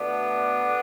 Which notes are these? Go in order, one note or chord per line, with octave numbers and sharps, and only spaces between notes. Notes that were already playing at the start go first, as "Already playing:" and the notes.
Already playing: B2 A3 B3 D4